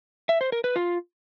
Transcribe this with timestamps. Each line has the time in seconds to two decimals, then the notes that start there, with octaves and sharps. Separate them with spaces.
0.29 E5
0.41 C5
0.52 A#4
0.64 B4
0.76 F4